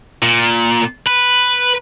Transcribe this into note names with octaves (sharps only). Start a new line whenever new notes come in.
A#2
B4